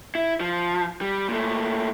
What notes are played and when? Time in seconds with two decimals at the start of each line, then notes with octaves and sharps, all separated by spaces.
0.15 E4
0.40 F3
1.01 G3
1.28 A#2 A3